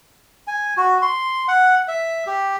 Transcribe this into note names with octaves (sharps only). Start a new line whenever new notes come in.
G#5
F#4
C6
F#5
E5
G4